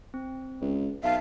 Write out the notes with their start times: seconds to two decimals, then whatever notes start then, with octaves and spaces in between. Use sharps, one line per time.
0.14 C4
0.61 C#2
1.03 B1 E5 F5 A5